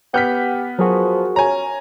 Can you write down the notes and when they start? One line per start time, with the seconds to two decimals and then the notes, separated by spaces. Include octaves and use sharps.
0.14 B3 G4 F#5 F6 G6 B6
0.79 F3 F#3 F#4 G#4 A#4
1.36 C#4 G#5 A#5